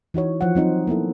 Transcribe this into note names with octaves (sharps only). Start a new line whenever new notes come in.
E3 D#4 F#4 C#5
F3 F4 F#5
F#3 C4 D#4 C5
A#3 B3 E4 A4